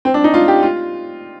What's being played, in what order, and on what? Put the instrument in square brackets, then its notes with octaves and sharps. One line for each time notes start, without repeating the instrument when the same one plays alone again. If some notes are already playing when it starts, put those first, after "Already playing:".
[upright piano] C4
D4
D#4
F4
G4
F4